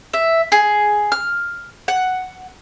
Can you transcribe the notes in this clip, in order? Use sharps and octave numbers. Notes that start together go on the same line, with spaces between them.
E5
G#4
F6
F#5